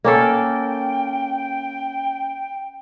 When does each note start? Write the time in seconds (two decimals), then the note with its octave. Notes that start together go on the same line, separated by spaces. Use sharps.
0.04 A#3 C#4 A4 G5